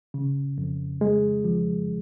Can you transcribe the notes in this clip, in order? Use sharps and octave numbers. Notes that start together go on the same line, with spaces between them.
C#3
F2
G#3
F3